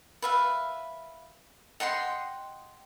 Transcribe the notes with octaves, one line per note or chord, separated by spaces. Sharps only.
B4 E5 F5
D#5 F#5 G5 C6